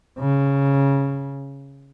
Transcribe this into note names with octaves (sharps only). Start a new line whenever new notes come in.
C#3